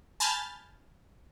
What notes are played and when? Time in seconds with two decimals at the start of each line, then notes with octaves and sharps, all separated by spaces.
0.20 G#5 A5 B5 F6 G6 A6